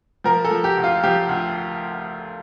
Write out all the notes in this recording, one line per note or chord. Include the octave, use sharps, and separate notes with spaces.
F3 A#4
A4
F3
G4
D2
F4
F3 G4
D2